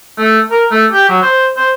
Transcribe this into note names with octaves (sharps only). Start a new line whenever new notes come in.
A3
A#4
A3
G4
F#3
C5
C5